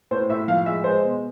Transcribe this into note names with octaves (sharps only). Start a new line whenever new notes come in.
A2 C5
A2 E5
F3 F5
G#3 E5
G#3 C5
B2